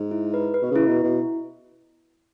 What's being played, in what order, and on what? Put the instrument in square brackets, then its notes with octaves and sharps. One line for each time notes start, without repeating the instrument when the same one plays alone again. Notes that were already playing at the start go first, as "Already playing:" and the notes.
Already playing: [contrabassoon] G#2
[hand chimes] E4
B4
B4
[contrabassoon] B2
[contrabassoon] C#3 [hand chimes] E4
[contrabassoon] B2
[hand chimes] E4
[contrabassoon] B2